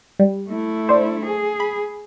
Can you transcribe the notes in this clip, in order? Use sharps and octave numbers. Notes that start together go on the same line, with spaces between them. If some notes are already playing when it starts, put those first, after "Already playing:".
G3
A3 E4
D4 C5
G#4
B5